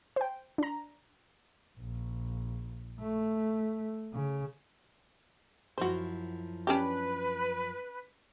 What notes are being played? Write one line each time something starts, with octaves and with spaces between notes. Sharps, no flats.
C5 G5
D4 A#5
A#1
A3
C#3
F#2 F3 E4 F#4 C5
C#4 D4 G4 B4